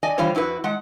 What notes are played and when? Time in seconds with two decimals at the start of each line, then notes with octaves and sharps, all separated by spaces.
0.03 D5 D#5 G#5
0.18 D3 E3 G3 F4 C5 C#5
0.35 F2 E4 F#4 B4
0.64 G#3 F#5